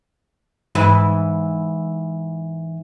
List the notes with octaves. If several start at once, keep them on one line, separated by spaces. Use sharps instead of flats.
G#2 E3 B4